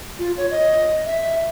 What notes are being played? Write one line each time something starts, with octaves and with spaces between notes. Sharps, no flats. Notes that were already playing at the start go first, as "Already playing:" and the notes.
F4
C#5
D#5
E5